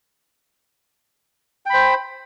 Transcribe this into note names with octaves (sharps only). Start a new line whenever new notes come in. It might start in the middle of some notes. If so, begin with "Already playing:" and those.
C5 G5 B5